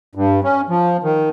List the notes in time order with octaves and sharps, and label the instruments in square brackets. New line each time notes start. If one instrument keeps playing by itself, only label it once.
[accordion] G2
C#4
F3
D#3